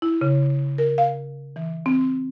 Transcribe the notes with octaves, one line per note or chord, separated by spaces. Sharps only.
E4
C#3
A#4
F5
E3
C4